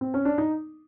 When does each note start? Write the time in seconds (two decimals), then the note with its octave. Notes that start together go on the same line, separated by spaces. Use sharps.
0.01 C4
0.14 C#4
0.25 D4
0.38 D#4